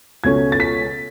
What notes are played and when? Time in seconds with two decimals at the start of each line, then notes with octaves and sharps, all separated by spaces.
0.24 C#2 B2 A3 C#4 G#6
0.52 A6
0.60 B6